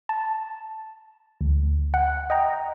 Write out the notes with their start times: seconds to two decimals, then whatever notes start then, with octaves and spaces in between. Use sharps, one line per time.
0.09 A5
1.41 D2
1.94 F#5
2.30 D#5 G5 A#5